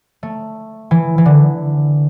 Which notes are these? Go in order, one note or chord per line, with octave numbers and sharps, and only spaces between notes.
A3
E3
E3
D3